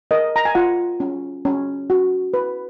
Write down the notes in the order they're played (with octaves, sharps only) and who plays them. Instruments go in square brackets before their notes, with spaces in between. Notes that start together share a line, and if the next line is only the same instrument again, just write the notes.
[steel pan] A#4 D#5
A#5
G#5
F4 F#5
C#4
C#4
F#4
B4